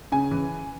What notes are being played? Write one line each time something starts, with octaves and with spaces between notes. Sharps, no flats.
C#3 G#5
E3